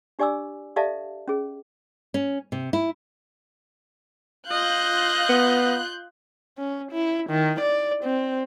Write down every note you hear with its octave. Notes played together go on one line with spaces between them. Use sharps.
D4 G4 D5 G#5 D6 E6
G4 A4 D5 E5 F5 A5
C#4 G#4
C#4
C3
E4
F4 D#5 F5 F#6 G6
B3
C#4
E4
D#3
D5
C4